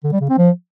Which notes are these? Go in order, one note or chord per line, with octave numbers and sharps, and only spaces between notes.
D3
G3
C#3
C4
F3